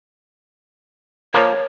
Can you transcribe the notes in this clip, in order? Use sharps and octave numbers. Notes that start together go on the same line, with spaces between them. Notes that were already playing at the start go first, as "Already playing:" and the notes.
F3 A#3 C#5